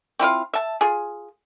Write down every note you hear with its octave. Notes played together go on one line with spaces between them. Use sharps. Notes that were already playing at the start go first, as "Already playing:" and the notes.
C4 E4 F4 F5
E5 A5
F4 G#4